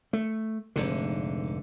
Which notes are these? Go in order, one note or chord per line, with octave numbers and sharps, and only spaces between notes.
A3
F1 G#2 D3